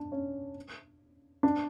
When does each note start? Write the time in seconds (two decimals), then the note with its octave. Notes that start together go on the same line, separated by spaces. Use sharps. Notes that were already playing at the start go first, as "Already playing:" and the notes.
Already playing: D4
0.12 C#4
1.43 D4